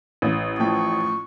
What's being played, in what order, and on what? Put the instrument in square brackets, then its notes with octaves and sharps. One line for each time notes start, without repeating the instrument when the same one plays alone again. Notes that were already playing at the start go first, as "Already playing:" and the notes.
[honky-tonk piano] A1
[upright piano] A2 F3 G5 [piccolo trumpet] C#6